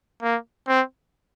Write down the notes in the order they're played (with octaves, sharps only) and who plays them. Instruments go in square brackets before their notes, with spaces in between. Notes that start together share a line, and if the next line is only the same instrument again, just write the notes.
[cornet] A#3
C4